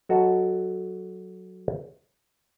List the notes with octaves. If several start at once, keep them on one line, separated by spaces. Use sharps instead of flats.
F#3 F#4 A4 D#5